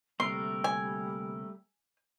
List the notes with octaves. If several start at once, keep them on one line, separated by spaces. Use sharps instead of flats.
D2 C3 G3 A3 A#3 A#4 C6
G#5